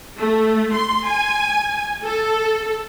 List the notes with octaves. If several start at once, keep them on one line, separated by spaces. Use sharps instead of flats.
A3
C6
G#5
A4